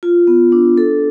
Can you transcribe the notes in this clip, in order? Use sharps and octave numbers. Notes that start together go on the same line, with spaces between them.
F4
B3
D4
A4